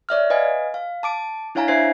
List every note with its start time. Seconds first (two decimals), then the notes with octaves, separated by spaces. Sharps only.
0.09 C#5 D5 E5 F6
0.30 B4 D#5 F5 G#5
0.74 F5
1.03 A5 D6 D7
1.55 D4 E4 C#5 F5 G#5 A#5
1.68 D4 C5 E5 G#6 C7